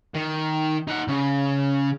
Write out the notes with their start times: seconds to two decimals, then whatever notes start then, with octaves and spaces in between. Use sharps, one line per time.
0.15 D#3
0.88 D#4 F#5
1.08 C#3